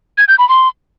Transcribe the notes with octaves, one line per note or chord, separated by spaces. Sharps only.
G#6
G6
B5
C6